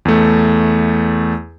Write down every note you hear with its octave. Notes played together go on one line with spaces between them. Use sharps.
E2 A3